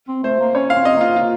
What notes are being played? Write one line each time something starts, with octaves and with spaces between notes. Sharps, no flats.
C4
A3 C5
A#3
C#4 C#5
F5
C4
D#5
A#3 F4
F4